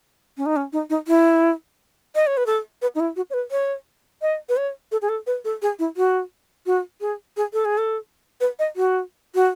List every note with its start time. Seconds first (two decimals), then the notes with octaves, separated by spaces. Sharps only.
0.37 C#4
0.46 D#4
0.56 C#4
0.73 D#4
0.90 D#4
1.08 E4
2.15 D#5
2.27 C#5
2.37 B4
2.46 A4
2.82 B4
2.95 D#4
3.00 E4
3.16 F#4
3.30 C#5
3.34 B4
3.51 C#5
4.22 D#5
4.49 B4
4.57 C#5
4.92 A4
5.02 G#4
5.09 A4
5.27 B4
5.45 A4
5.62 G#4
5.79 E4
5.97 F#4
6.66 F#4
7.01 G#4
7.37 G#4
7.53 A4
7.65 G#4
7.78 A4
8.41 B4
8.59 D#5
8.76 F#4
9.35 F#4